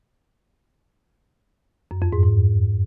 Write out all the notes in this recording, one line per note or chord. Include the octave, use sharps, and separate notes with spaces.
F#2
F2
G#2
G#2